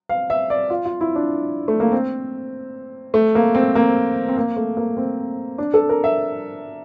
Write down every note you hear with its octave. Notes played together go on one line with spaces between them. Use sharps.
F5
E5
D5
F4
F4
E4
D4
A3
A#3
C4
A3
A#3
C4
A#3
C4
A#3
A3
A#3
C4
D4
A4
A#4
E5